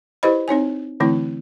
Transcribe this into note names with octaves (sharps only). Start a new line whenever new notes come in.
E4 G4 B4 C5 D#5 B5
C4 D#4 C#5 G#5
D3 E3 A3 C4 E4